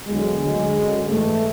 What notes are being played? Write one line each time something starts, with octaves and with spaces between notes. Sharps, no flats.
E2 D3 F#3 G#3
D2 D3 F#3
F#2 D3 F#3
G#2 E3 A3